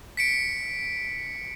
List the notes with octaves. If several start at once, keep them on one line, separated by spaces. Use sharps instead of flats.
B6 C#7 D7